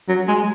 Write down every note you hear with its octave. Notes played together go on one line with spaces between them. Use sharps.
F#3
G#3